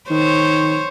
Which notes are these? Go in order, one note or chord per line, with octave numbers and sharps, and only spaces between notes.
D#3 C5 C#5